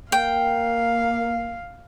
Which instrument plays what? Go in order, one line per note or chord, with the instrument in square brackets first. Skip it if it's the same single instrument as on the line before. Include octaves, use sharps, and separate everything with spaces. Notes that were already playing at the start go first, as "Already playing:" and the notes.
[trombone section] A#3 [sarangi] F5 [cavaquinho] G5